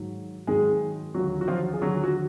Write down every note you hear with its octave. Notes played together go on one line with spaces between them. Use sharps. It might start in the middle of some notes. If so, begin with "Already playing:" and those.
Already playing: G#2 D#3 F#3
G#2 D#3 F#3 G#3 G#4
D#2 D3 F#3 F#4
F#4
F3 F4
G#4
D#2 D3 F#3 F#4
F#3 F#4